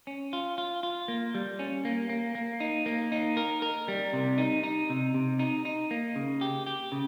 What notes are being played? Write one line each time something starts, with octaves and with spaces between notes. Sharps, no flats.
C#4
F4
F4
F4
A#3
G3
C#4
A#3
A#3
A#3
D#4
A#3
D#4
A#4
A#4
G3
C3
D#4
D#4
C3
C3
D#4
D#4
A#3
C#3
G4
G4
C#3